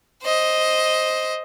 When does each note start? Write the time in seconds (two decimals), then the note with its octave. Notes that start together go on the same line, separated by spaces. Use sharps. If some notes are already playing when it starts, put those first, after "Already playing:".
0.23 C5 D#5